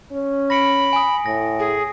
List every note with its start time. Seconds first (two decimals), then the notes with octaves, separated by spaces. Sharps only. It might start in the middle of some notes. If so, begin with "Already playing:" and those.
0.12 C#4
0.50 B5 A#6 C#7 D7
0.93 G#5 D#6
1.26 A2 A#6
1.59 G#4